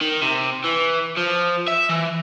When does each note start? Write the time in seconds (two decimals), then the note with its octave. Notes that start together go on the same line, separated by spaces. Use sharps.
0.01 D#3
0.22 C3
0.64 E3
1.17 F3
1.68 E5
1.90 E3